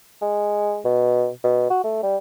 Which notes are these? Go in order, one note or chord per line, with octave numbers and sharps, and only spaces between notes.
G#3
B2
B2
F#4
A3
G3